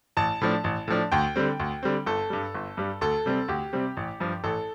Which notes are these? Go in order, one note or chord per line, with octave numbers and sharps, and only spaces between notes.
A1 A5
A2 F3 D4
A1
A2 F3 D4
D2 G5
D3 G3 C4
D2
D3 G3 C4
G1 A4
G2 G3
G1
G2 G3
D2 A4
C3 G3 C4
D2 G4
C3 G3 C4
A1
G2 F3
A1 A4